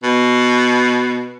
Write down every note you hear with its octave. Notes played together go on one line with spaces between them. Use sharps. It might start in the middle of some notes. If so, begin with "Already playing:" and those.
B2